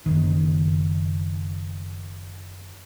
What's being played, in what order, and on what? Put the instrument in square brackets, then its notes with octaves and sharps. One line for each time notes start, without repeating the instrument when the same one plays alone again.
[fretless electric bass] F#1 D#3